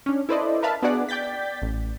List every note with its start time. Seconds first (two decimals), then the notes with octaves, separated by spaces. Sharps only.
0.06 C#4 D4
0.29 E4 A4 B4 C5 D5 D#5
0.63 A#4 B4 E5 F5 A5 B5
0.82 B3 D4 F#4 G#4 D5 F#5
1.09 D5 G5 G6 A6 B6
1.62 A1